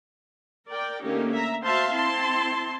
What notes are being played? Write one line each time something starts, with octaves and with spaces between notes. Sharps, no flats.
A#4 D5 G5
D3 A3 A#3 C#4 D#4 G4
E5 A#5
F#4 C5 E5 F5 A5 C6
C4 E4 A5 C6